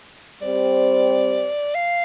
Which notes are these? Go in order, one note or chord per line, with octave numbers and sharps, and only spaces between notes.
G3 C4 G4 C5 D5
F5